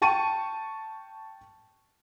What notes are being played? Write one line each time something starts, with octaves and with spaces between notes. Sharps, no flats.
G5 A5 C#6 D#7